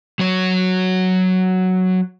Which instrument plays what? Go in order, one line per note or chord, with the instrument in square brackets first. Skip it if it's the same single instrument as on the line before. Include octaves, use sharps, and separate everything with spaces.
[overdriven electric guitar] F#3 C#5